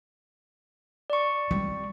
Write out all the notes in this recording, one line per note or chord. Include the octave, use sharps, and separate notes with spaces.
D5 C#6
G3 C4